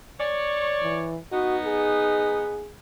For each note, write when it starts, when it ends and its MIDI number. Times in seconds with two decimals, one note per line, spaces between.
0.19 1.12 73
0.19 1.12 74
0.82 1.18 52
1.32 2.65 59
1.32 2.65 63
1.32 1.57 66
1.65 2.72 68